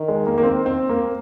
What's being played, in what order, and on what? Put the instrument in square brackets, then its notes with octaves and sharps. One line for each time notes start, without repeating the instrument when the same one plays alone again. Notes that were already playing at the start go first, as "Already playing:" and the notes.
Already playing: [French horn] D#3
[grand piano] G#3
A#3
A#3
C4
C4
A#3